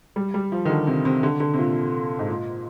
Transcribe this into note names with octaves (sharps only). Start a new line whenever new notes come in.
G3
G3
F3
D#3
D3
C3
C3
D3
D3
C3
A#2
G#2
A#2